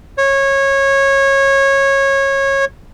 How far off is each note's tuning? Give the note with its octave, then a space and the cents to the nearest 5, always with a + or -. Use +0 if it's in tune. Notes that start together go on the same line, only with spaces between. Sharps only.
C#5 -20